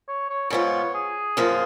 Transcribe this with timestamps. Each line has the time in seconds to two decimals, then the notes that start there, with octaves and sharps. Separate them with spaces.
0.08 C#5
0.30 C#5
0.50 G#2 F3 B3 F4 C#5
0.94 G#4
1.37 F#2 F3 A#3 F4